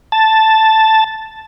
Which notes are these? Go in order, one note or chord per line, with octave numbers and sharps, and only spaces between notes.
A5